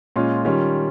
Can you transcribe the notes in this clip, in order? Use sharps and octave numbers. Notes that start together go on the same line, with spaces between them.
A#2 G#3 C#4 F4
D#3 G3 C#4 F4